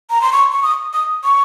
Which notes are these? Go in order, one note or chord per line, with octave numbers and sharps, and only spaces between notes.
A#5
C6
C#6
C#6
D#6
D#6
C#6